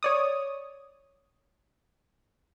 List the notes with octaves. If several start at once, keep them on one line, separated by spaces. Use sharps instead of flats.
C#5 D5 D#6